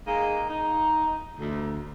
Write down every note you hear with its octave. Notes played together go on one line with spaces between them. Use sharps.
G#3 A#3 D#4
D#4
D2